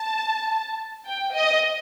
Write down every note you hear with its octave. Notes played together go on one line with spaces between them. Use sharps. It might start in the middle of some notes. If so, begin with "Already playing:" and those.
Already playing: A5
G5
D#5